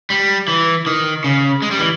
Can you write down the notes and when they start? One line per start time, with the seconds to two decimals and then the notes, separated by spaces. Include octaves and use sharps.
0.10 G3
0.48 E3
0.86 D#3
1.24 C#3
1.62 G#3
1.71 G3
1.79 E3